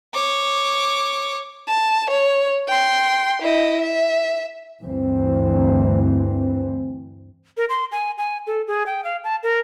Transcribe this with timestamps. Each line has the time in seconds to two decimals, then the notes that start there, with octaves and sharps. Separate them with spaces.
0.14 C#5 D6
1.67 A5
2.10 C#5
2.68 G5 C6
3.42 E4 D#5
3.81 E5
4.81 D2 G2 E3 C4
7.57 A#4
7.69 C6
7.92 G#5
8.18 G#5
8.47 A4
8.67 G#4
8.86 G5
9.04 F5
9.24 A5
9.43 A#4